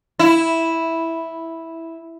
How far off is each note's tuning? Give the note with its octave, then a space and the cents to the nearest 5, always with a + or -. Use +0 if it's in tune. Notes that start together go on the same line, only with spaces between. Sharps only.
E4 -5